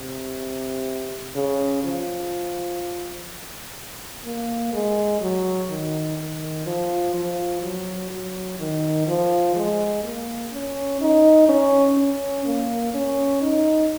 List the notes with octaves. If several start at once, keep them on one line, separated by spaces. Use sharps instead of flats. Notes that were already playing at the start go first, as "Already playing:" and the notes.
Already playing: C3
C#3
F3
A#3
G#3
F#3
D#3
D#3
F3
F3
F#3
F#3
D#3
F3
G#3
A#3
C#4
D#4
C#4
C#4
A#3
C#4
D#4